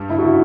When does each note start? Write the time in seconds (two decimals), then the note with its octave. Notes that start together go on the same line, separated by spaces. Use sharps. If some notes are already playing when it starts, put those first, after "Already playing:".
Already playing: G2 G3
0.10 E4
0.19 F#4
0.24 E4